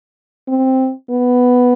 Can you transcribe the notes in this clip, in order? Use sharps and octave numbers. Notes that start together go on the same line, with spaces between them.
C4
B3